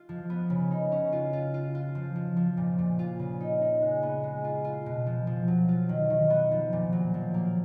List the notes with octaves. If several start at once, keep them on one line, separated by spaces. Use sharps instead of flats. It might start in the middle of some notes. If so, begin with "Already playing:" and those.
Already playing: F4
F3
B3
C#3
D#4
C#4
F4
F4
F4
F4
F3
F3
F3
A#2
A#2
F4
C#3
D#4
D#4
G#3
B3
G#3
F4
F4
B2
F3
F3
F#3
F4
D#3
D#3
B3
F3
A#2
F#3
F3
A#3